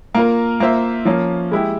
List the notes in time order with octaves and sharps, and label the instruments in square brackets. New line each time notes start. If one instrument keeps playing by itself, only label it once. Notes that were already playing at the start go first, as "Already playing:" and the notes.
[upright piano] A#3 F4 A#4
A#3 F4 C5 E5
F3 A#3 C#4
G#3 E4 G4